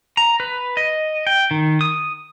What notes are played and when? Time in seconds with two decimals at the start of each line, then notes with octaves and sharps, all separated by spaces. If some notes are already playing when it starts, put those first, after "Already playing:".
0.17 A#5
0.40 B4
0.77 D#5
1.27 G5
1.51 D#3
1.81 D#6